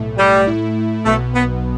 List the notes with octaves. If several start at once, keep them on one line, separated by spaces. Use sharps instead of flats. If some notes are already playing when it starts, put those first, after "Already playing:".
Already playing: B1 A2 A3
G3
A2 A3 E4
B1 B2 A3 B3
B3